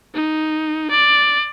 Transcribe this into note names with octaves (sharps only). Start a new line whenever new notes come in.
D#4
D5